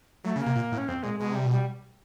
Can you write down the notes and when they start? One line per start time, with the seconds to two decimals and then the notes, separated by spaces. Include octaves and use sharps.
0.24 F#3 A3
0.36 C#3
0.40 A#3
0.46 C3
0.56 A#2
0.72 A2
0.78 C#4
0.88 F2 C4
1.03 A#2 G#3
1.19 B2 G#3
1.32 C3 G3
1.45 B2
1.51 G3